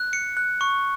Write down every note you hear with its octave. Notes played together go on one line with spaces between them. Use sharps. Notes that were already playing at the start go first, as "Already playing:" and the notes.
Already playing: F#6
C#7
F#6
C#6